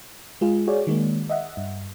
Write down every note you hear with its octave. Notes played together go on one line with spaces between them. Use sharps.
G#3 F4 G#4
F#4 G#4 C#5 D5
D#3 G#3 A#3
D#5 E5 F#5
G2